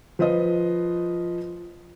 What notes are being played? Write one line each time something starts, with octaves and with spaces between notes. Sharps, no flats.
F3 B4 C5 D#5